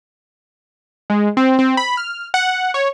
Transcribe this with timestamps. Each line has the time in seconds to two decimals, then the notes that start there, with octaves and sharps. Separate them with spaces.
1.10 G#3
1.37 C4
1.59 C4
1.77 B5
1.97 F6
2.34 F#5
2.74 C#5